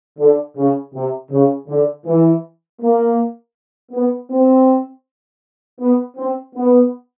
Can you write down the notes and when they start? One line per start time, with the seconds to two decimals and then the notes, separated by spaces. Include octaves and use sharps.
0.18 D3
0.56 C#3
0.93 C3
1.30 C#3
1.68 D3
2.05 E3
2.80 A#3
3.92 B3
4.30 C4
5.79 B3
6.16 C4
6.54 B3